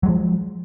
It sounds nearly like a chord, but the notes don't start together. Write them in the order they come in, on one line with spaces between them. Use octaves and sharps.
F#3 G#3 F3